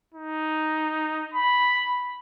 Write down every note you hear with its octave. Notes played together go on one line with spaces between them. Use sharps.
D#4
B5